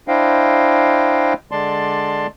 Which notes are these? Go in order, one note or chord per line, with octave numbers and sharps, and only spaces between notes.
D4 E4 C5 D#5 F5 G5
D3 G#3 D5 A5 C6